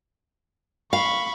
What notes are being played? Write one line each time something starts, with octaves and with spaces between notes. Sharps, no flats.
F5 B5 C#6